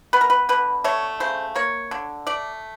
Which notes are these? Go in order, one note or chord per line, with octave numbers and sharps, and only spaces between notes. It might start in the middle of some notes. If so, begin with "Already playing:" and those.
B3 B4
A#4
B4
D3 B4
A3 C#5
C#3 C5
A#3 C#5
D3
A3 D5